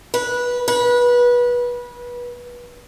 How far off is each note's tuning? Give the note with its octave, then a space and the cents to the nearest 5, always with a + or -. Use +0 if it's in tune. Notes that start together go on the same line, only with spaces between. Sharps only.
B4 -15
B4 -25